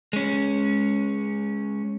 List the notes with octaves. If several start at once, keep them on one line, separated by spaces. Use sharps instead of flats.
G#3 C#4